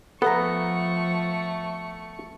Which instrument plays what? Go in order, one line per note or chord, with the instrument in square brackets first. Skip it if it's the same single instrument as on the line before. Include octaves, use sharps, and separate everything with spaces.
[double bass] F3 [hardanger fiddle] A3 C#6 [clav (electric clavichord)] B3 [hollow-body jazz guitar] A4 F#5 A#5